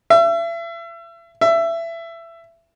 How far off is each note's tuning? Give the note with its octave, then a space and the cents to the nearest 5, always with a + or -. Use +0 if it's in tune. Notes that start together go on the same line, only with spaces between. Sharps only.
E5 +35
E5 +20